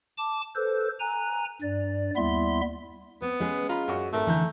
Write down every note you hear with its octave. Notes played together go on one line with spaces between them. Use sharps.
A5 D6
A4 B4 C5
G#5 A#5 F#6
G2 D5
D#2 G3 B3 E4 E5 C6
B3 C4
G#3 C#4 G#4 B4
F4 A#5 B5
F#2 F#4 C#6
G#1 A3 A#4
D3 E3 G#5 A#5 G6